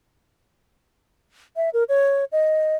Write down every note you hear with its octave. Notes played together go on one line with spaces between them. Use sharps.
E5
A#4
C#5
D#5